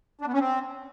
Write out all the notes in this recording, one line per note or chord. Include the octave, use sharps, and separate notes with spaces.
D4
B3
C#4
C4